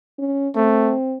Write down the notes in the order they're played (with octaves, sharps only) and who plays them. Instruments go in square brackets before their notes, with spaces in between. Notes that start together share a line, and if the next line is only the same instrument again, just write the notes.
[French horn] C#4
[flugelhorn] A3 [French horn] C4